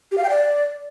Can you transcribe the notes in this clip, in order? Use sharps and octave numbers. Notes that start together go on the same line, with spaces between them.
G4
F5
G5
D5